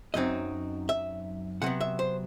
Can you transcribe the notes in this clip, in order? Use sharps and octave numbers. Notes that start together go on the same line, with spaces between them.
F#2 F#3 C4 D#4 D#5
E5
C3 F#3 B3 F#5
E5
C5